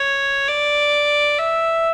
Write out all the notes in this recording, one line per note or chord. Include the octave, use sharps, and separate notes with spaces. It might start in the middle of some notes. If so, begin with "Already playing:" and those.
Already playing: C#5
D5
E5